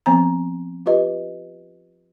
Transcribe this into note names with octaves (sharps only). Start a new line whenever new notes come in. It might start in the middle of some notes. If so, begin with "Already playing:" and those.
F3 B3 C4 G#5 A#5
F4 G4 B4 D#5